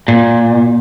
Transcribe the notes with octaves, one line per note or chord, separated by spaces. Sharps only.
A#2